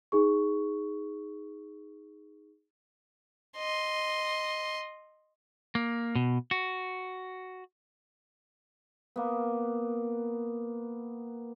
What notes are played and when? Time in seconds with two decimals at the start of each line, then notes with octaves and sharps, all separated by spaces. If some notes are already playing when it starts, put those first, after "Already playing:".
0.12 D#4 G#4 C#6
3.57 D#5 C6
5.75 A#3
6.15 B2
6.51 F#4
9.16 A#3 B3